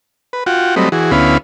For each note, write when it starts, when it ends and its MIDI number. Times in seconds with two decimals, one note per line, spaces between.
0.33 0.44 71
0.46 0.75 65
0.46 0.75 66
0.46 0.75 78
0.46 0.75 79
0.76 0.89 54
0.76 0.89 55
0.76 0.89 57
0.76 0.89 60
0.76 0.89 75
0.76 0.89 83
0.92 1.11 52
0.92 1.11 66
0.92 1.11 68
1.11 1.38 38
1.11 1.38 59
1.11 1.38 61
1.11 1.38 64
1.11 1.38 77
1.11 1.38 83